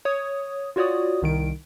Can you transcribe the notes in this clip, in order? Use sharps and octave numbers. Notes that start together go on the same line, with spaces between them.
C#5 D#6
F4 F#4 C#5 D5 D#6
C2 D#3 D7